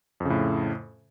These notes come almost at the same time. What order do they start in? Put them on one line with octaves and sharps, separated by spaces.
F2 C#3 A2